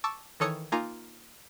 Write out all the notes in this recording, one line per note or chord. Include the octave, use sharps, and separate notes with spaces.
A5 C#6 D6 E6
D#3 E3 A4 C#5 D#6 C#7
A#3 D#4 F4 G#5 A#5